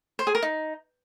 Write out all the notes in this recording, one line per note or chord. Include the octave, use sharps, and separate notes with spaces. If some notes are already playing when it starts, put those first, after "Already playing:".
C5
G#4
A#4
D#4